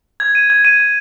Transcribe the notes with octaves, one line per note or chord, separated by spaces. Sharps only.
G#6
D#7
G#6
D#7
G#6